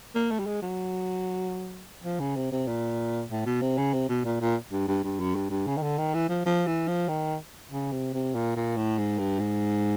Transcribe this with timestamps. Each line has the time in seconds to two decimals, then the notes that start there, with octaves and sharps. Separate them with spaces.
0.15 A#3
0.30 A3
0.39 G3
0.46 G#3
0.62 F#3
2.04 F3
2.20 C#3
2.36 C3
2.52 C3
2.67 A#2
3.30 A2
3.46 B2
3.62 C3
3.78 C#3
3.94 C3
4.09 B2
4.25 A#2
4.41 A#2
4.72 G2
4.88 G2
5.04 G2
5.20 F#2
5.35 G2
5.50 G2
5.67 C#3
5.77 D#3
5.82 D3
5.98 D#3
6.14 E3
6.29 F3
6.45 F3
6.66 E3
6.88 F3
7.08 D#3
7.72 C#3
7.92 C3
8.14 C3
8.35 A#2
8.56 A#2
8.77 A2
8.98 G#2
9.19 G2
9.39 G#2